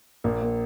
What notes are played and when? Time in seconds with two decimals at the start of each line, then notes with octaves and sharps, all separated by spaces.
0.24 A#1 A#3
0.41 A#3